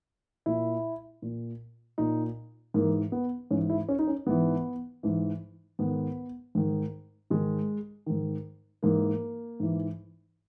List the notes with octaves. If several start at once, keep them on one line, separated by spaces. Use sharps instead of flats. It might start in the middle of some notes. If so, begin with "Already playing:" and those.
A#2 E4
A#2
A#2 D#4
G#2 E3 A#3
B3
G#2 E3 C#4
E4
C#4
D#4
C#4
G#2 E3 B3
G#2 E3
G#2 D#3 B3
G#2 D#3
G#2 D#3 G#3
G#2 D#3
G#2 E3 A#3
G#2 E3